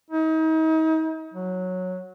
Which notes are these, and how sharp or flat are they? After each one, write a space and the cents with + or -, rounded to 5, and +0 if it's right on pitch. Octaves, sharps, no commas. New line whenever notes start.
D#4 +40
F#3 -10